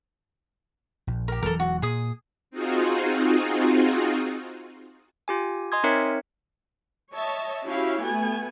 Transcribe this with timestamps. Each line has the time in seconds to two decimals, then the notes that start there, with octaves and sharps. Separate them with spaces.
1.07 A#1
1.28 G4 A#4
1.43 E1 E3 F#3 A4 A#4
1.60 F#4
1.82 A#2 G#4 D#6
2.51 C4 D#4 F4 F#4 G#4
5.28 F4 G4 G#5
5.72 D#5 G#5 C6 D#6 G#6
5.83 C4 D#4 A#4 C#5 E5 C#7
7.14 C#5 D#5 E5 A5
7.65 C#4 E4 F#4 G4 F5
8.04 A3 B3 G#5